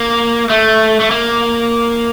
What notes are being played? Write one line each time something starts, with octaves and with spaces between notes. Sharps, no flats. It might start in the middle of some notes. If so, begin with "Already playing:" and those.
Already playing: A#3
A3
A3
A#3